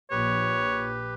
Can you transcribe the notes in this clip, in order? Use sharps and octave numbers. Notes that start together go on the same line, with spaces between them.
A#1 G4 B4 C#5